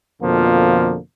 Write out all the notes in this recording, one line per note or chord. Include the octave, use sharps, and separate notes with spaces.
F2 B2 D3 F3 A#3